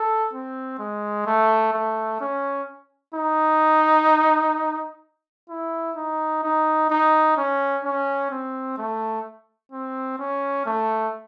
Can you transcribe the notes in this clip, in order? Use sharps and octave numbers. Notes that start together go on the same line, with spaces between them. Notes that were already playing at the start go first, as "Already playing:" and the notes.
Already playing: A4
C4
G#3
A3
A3
C#4
D#4
E4
D#4
D#4
D#4
C#4
C#4
C4
A3
C4
C#4
A3